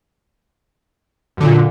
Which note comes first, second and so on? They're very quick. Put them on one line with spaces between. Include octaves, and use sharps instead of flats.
F#2 D3 A#2